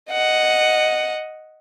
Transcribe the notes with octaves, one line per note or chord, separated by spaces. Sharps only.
D#5 F#5